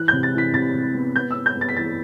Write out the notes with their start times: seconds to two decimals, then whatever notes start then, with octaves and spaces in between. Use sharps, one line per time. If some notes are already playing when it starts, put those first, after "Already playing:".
Already playing: E3 F#6
0.08 C3 G6
0.23 A6
0.34 E3 B6
0.54 C3 A6
0.74 C3
0.94 B3
1.15 B3 G6
1.31 B3 E6
1.46 G6
1.56 B3
1.61 A6
1.69 B6
1.76 E3 A6